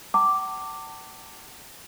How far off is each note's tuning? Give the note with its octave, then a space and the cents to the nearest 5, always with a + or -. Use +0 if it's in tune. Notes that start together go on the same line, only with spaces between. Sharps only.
F#5 +45 A5 +35 D6 +0